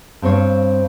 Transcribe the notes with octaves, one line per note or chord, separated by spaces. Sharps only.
G2 C4 C5 C#5 F5